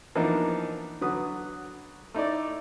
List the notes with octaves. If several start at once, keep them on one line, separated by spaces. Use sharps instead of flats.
E3 F3 A#3 B3 D4 D#4
D3 F#3 B4 D#6
A3 D#4 E4 D5